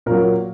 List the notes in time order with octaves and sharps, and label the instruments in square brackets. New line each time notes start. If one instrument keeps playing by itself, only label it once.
[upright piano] A#2 F#3 A#4